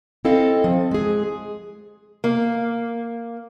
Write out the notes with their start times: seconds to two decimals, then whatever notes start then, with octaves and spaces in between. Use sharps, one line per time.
0.25 C4 E4 A4 D#5 F5
0.64 F3
0.91 G#3 G#4
2.24 A#3